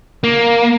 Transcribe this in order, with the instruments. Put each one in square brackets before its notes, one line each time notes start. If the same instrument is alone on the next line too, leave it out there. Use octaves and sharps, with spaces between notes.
[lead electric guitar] A#3